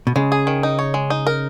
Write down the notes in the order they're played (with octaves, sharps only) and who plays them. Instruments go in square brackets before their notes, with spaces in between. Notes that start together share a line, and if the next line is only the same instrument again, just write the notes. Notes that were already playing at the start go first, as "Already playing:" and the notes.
[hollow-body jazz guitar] B2
[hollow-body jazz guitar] C#3 [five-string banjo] G#3
[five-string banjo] G#4
D#3
D#4
C#5
G#3
D#4
A#4